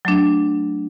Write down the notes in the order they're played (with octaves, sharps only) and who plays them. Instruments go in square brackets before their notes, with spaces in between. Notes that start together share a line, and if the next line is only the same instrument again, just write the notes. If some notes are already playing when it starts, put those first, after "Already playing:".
[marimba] F#3 A3 D4